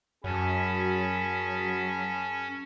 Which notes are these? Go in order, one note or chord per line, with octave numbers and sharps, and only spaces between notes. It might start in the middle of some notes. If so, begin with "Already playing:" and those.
F#2 F#3 C#4 G#4 A5 B5